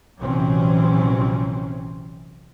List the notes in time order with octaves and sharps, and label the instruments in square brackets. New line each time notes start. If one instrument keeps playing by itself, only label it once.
[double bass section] A#1 C3 E3 F#3 C4 C#4